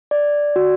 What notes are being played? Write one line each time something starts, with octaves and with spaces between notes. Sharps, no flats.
D5
F#4